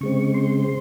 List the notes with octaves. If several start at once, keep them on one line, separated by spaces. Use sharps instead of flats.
C#3 G#3 C4 C#6
C6